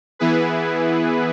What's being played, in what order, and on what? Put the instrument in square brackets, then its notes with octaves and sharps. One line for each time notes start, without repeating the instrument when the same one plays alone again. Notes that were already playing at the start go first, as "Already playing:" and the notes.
[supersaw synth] E3 B3 E4 G#4 B4